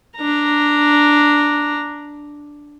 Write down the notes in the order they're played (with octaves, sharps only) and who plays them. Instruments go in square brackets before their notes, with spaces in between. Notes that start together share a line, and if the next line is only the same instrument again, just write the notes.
[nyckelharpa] D4 A#5